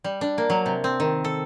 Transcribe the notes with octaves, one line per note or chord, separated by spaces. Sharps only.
G3
D4
A#3
F#3
C3
C4
D#3
A4